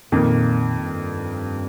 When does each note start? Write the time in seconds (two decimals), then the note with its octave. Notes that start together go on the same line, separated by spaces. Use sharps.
0.12 F2 A#2 D#3 A#3
0.82 G2